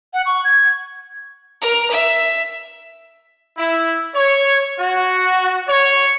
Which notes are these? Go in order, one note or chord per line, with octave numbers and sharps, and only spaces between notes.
F#5
C#6
G#6
A#4 A#5
E5
E4
C#5
F#4
C#5